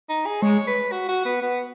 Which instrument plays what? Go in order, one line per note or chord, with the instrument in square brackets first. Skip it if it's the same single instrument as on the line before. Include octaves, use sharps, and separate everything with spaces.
[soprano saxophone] D#4
G#4
[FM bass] G#3 [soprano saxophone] C#5
[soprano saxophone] B4
F#4
F#4
B3
B3